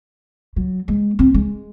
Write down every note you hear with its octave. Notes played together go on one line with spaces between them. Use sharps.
F#3
G#3
C4
G#3